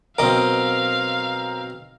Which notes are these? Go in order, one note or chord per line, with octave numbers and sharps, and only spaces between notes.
B1 C4 A#4 D#5 F5 D6